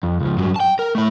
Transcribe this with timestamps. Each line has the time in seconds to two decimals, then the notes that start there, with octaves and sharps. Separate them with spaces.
0.03 F2
0.20 C#2 F3
0.37 G2 F#3
0.56 G5 A5
0.79 A#4
0.95 A3 E4